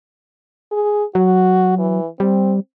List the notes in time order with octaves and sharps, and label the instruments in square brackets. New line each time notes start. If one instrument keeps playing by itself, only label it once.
[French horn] G#4
[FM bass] F#3 [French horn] F#4
[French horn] E3
[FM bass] G3 [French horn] C4